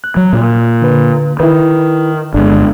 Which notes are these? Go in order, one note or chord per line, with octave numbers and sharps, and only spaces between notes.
F#6
F#3
A#2
D3 B4
D#3 E4 B4
G1 G#3 D4